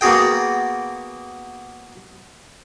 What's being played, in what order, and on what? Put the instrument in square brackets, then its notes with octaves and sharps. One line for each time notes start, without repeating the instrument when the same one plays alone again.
[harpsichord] A#3 B3 F#4 G#4 G5